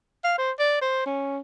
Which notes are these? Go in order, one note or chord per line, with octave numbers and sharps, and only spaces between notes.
F5
C5
D5
C5
C#4